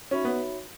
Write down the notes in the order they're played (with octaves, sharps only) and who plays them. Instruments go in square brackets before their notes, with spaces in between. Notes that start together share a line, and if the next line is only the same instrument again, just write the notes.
[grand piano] C#4 [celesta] D#4 F#4 C#5 E5 B5
[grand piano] B3